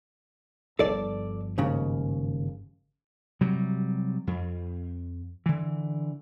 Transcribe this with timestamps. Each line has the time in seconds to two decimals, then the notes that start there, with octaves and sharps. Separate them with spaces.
0.79 G1 F3 A4 D5
1.58 D#2 G#2 C#3
3.41 C3 F#3 G3
4.27 F2
5.46 D3 E3